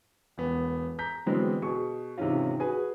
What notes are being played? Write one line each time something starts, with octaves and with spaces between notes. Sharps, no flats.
E1 B3
A#5 G6 B6
D3 E3 F#3 G#3 B3 C4
B2 G#4 C#6
G#2 C3 D#3 E3 C#4 F4
F#4 G#4 B4 G#5